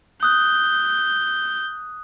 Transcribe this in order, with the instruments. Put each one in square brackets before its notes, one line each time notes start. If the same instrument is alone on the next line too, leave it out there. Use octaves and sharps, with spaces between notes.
[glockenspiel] D#6 F#6 [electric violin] G6